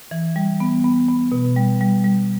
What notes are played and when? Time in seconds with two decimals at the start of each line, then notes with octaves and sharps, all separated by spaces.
0.11 E3
0.36 G3
0.60 B3
0.84 B3
1.09 B3
1.32 B2
1.56 G3
1.81 G3
2.04 G3